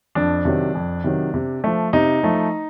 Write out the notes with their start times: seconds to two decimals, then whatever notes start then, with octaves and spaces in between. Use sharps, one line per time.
0.15 F2 D4
0.45 C3 D#3 F#3
0.75 F2
1.04 C3 D#3 F#3
1.34 C3
1.64 F3 A3
1.93 C3 D#4
2.23 F3 A3